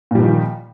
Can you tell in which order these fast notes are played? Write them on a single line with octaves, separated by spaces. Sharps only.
A#2 G3 F3 D#3